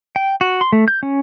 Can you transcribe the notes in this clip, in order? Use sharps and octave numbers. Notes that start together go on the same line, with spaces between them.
G5
F#4
C6
A3
G6
C#4